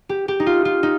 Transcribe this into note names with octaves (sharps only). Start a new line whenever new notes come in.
G4
G4
D#4
F4
F4
D#4